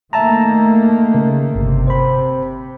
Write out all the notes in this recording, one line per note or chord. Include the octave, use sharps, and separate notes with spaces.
D#3 A3 A#3 E5 A5 A#5
C#3 A#4
G1 C3
C5 B5